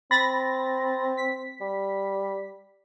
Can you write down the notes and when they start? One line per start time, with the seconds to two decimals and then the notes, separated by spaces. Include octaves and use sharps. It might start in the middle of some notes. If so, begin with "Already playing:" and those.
0.11 C4 B5 A6 A#6
1.17 B6
1.61 G3